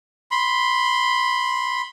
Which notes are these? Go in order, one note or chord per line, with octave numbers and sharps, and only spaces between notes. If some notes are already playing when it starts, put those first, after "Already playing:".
B5 C6